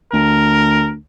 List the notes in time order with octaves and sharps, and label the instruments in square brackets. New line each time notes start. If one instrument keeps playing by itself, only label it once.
[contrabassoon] D2 [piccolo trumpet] A#4